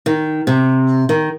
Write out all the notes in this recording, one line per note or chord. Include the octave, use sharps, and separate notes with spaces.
D#3
C3
D#3